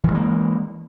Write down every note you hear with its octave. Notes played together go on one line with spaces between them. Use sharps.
E3 F3 G#3 A#3